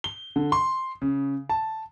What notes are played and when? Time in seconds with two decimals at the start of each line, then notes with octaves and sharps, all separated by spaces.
0.04 G7
0.36 D3
0.52 C6
1.02 C#3
1.49 A5